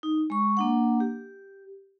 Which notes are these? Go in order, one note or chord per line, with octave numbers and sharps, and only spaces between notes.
D#4
G#3 C#6
A#3 D4 F#5
G4